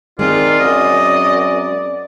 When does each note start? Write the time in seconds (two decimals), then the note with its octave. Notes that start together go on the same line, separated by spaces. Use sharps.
0.19 D#3 G#3 C4 D#4 F4 D5
0.60 F#2 D#5